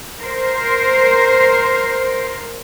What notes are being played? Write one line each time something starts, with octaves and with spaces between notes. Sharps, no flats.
A#4 C5